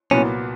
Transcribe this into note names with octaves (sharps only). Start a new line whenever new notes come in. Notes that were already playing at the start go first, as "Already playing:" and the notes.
C2 A#2 F#3 B3 C#4